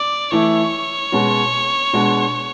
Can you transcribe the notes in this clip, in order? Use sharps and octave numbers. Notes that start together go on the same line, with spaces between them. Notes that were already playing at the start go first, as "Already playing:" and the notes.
Already playing: D5
E3 A3 E4 C#5
B2 G#3 C#4 F#4
B2 G#3 D4 F#4